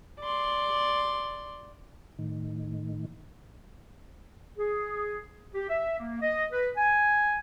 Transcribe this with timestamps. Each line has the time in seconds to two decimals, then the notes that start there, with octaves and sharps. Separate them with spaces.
0.20 D5 C6
2.19 A2 D#3
4.58 G#4
5.54 G4
5.70 E5
5.99 A#3
6.22 D#5
6.53 B4
6.77 G#5